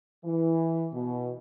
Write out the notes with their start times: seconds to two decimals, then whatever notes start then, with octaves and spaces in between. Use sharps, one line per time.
0.25 E3
0.93 B2